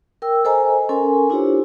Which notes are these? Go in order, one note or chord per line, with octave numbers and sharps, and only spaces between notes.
A#4 G5 E6
A4 C5 D#5 G#5 A#5
C#4 A4 A#4 G#5 C6
D4 E4 F4 G4 C5 C#5